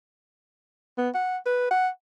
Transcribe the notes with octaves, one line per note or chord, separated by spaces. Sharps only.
B3
F#5
B4
F#5